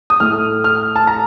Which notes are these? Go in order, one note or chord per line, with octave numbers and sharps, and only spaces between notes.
D#6
A2 A3 F6
F6
A5
A#5